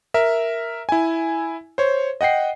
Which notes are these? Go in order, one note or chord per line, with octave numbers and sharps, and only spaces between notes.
A#4 E5
E4 G#5
C5 C#5
D#5 F#5 G5 C7